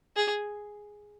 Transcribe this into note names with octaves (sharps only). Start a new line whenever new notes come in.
G#4